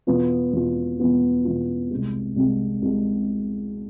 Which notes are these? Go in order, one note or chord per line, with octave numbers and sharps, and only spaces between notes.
E2 B2 B3 F4
E2 B2 B3 F4
E2 B2 B3 F4
E2 B2 B3 F4
C2 C3 G#3
C2 C3 G#3
C2 C3 G#3